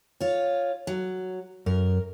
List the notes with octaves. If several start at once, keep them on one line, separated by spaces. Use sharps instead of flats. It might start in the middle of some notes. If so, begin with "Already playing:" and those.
F4 C#5
F#3
F#2 A#4